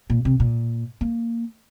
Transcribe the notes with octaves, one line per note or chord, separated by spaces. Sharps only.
A#2
C3
A#2
A#3